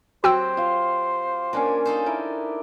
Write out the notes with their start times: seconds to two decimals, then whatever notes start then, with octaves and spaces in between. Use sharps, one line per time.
0.24 F#3 C4 F#4 G4 C5 G5 E6
0.57 F4 F5
1.53 A#3 C#4 D4 G#5
1.85 D#4 A4 C5
2.06 E4 A#4 D5